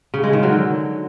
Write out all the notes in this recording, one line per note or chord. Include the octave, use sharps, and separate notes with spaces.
C#3
G#3
D#3
F#3
D3